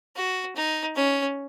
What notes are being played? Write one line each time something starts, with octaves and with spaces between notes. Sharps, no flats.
F#4
D#4
C#4